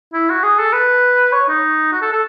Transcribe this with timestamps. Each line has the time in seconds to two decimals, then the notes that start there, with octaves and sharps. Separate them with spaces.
0.13 E4
0.29 F#4
0.43 G#4
0.59 A4
0.73 B4
1.32 C#5
1.48 D#4
1.92 F#4
2.02 A4
2.12 A4